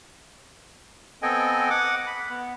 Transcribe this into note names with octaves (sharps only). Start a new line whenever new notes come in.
B3 C4 A4 D#5 G5 G#5
F#5 D6
B5
B3